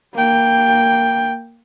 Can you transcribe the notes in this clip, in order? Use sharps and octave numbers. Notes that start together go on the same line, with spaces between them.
A#3 G5